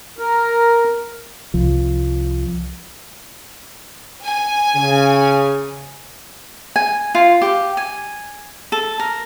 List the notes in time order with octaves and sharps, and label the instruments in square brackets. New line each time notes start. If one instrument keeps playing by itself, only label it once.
[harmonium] A#4
[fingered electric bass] C2 F3
[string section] G#5
[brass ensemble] C#3
[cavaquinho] G#5
F4
G4
G#5
A4
A#4